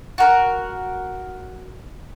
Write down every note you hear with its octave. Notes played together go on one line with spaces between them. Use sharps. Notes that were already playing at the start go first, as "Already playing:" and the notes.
F#4 A#4